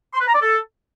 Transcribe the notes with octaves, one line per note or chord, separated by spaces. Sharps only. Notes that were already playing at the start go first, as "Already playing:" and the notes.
C6
B4
A#5
D5
A4